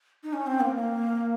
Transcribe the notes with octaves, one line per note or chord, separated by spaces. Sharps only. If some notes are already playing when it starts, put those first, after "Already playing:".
D#4
C#4
C4
A#3
A#3